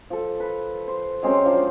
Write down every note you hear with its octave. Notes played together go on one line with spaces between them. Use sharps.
F3 A4
B4
C5
F#3 G#3 C4 C#4
F3 D4